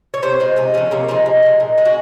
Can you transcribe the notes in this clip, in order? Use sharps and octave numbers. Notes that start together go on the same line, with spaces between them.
C#5
C3 C5
F3 G#3
C3 D#4
F3 G#3 C#4
C3 A#3
F3 G#3 D#4
C3
F3 G#3
A#2
G#3
F#4